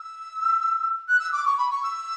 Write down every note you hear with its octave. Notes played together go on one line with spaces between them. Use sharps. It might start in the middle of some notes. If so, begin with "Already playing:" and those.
Already playing: E6
F#6
E6
D6
C#6
B5
C#6
E6